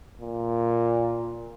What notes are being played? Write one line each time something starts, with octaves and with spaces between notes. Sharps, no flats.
A#2